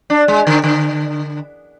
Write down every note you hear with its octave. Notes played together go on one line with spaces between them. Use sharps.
D4
G#3
D3
D3